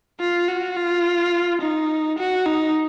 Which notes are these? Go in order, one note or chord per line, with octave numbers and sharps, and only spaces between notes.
F4
F#4
F4
D#4
F#4
D#4